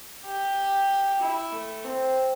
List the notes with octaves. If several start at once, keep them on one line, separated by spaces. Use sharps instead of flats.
G4
E4
A3
C4